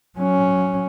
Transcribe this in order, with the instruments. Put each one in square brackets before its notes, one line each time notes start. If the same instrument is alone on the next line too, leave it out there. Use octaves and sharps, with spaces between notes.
[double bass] F#3 C#4